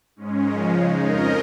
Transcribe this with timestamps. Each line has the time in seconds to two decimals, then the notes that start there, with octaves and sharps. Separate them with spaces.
0.16 G#2 G#3 C#4
0.44 C#3 F3 G#3 C#4 A#4 D#5
0.72 C#3 G#3 D#4 C#5 F5
1.00 F2 F3 C#4 A#4 D#5